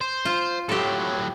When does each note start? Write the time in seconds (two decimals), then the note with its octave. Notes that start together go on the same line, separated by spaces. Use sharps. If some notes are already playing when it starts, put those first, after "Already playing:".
0.01 C5
0.25 F4
0.69 A2 F#3 G4 A4